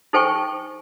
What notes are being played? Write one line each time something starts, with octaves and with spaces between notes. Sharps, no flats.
D#4 A4 C5 G5 G#5 C#6